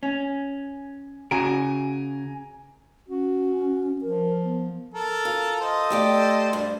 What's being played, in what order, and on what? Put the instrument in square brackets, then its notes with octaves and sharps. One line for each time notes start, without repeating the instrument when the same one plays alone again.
[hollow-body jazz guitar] C#4
[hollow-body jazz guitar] C#3 F#4 [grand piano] G#5 A#5 D7
[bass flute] C#4 [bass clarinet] F#4
[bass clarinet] F3 [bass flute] A#4
[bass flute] B3
[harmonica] A4 A#4
[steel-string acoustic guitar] F4
[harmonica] A4 C5 D#5
[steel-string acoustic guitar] A3 G4 D5
G2